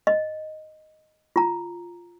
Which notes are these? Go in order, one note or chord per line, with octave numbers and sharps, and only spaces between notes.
D#5
F4 A#5